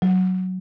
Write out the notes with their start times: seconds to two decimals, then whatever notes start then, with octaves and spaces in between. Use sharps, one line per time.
0.02 F#3